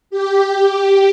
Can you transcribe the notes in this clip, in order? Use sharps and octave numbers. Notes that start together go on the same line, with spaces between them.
G4
G4